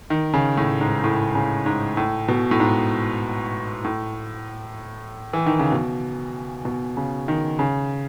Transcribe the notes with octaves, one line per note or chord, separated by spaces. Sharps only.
D#3
C#3
A2
G#2
A2
C#3
G#2
A2
B2
A2
G#2
A2
E3
D#3
C#3
B2
B2
C#3
D#3
C#3